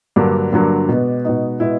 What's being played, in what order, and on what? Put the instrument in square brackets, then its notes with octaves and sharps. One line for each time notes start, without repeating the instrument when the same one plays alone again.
[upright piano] G2 D3 F#3 A#3 D4
G2 D3 F#3 A#3
B2 G#3 B3
B2 G#3 B3 D#4
B2 G#3 B3 E4